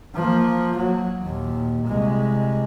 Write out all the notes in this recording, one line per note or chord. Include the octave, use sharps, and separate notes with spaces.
F3 A#3
F#3
D#2 A#2
C2 G#3